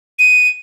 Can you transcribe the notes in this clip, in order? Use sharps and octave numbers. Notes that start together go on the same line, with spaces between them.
D#7